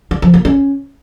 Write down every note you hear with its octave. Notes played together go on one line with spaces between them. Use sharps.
D4
F3
A#3
C#4